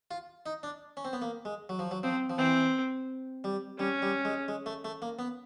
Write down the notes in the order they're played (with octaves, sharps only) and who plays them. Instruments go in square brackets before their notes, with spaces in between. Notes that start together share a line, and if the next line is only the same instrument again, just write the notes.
[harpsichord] F4
D#4
D4
C#4
C4
B3
A#3
G#3
F#3
F3
F#3
[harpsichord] F3 [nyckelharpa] C4
[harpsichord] F3
[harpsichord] E3 [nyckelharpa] C4
[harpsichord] G3
[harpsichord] G3 [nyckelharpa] C#4
[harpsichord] G3
G#3
G#3
A3
A3
A#3
B3